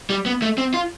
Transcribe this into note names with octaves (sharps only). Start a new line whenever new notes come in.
G3
B3
A3
C4
F4